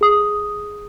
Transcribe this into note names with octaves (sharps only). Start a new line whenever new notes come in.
G#4 D#6